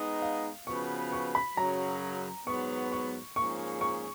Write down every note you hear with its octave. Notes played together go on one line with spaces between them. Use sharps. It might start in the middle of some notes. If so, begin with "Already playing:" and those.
Already playing: G#3 B3 D#4
F5
C#3 F3 B3 F#4 B4 C#6
C#6
B5
F#2 C#3 F#3 A#5
G#2 F#3 B3 C#6
C#6
G#2 F3 A#3 C#4 G#4 C#6
C#6